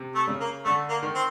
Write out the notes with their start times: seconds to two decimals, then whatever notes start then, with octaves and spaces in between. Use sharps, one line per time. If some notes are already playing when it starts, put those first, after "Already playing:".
Already playing: C3
0.15 A3
0.27 C#3
0.41 A#3
0.65 D3 A3
0.89 A#3
1.03 D#3
1.15 C4